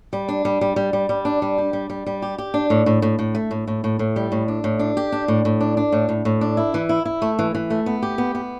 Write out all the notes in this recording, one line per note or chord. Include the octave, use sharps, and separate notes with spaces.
G3
D4
G3
G3
G3
G3
G3
D4
G3
G4
G3
G3
G3
G4
G4
D4
A2
A2
A2
A2
A3
A2
A2
A2
A2
G3
A2
D4
A2
D4
G4
D4
A2
A2
D4
D4
A2
A2
A2
D4
E4
E3
E4
E4
A3
E3
E3
A3
B3
G4
B3
B3